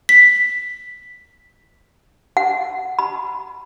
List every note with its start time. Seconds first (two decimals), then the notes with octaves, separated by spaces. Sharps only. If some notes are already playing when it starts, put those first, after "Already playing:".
0.09 B6
2.37 F#5
2.99 B5